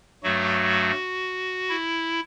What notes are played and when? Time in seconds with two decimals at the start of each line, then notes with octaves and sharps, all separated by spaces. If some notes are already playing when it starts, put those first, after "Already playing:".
0.23 G2 F#3 A3 F#4
1.69 E4